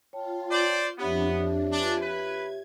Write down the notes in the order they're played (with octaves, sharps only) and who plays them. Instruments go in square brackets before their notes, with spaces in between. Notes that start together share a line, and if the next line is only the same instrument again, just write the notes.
[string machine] F4 [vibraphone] C#5 G5 A5
[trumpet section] C5 D5
[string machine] F2 D4 [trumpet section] B3 [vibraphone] G4 C#5 E5
[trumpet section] D4 [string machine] F4 B4 G#5
[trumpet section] B4 [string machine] G#6